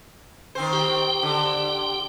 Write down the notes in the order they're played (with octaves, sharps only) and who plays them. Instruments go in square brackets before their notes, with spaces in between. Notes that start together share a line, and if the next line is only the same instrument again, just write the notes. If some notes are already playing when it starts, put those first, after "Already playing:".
[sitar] D#3 C4 C5
[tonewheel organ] G4 G5
[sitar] D3